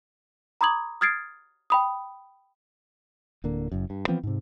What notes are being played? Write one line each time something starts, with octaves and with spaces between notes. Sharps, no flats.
A#5 B5 D6 D#6 G#6 F#7
D#6 F6 G#6 A6 C7 D7
G5 B5 D#6
D1 D3 A#3
F#1 F#2
G2
E3 F3 B3 C4
G#2 C3